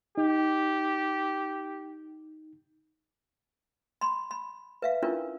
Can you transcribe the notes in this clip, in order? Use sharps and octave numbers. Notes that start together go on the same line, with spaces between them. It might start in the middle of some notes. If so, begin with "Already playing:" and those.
D#4 G4
B5 C6
B5
B4 E5 F5
C#4 D4 E4 F4 A#4 B4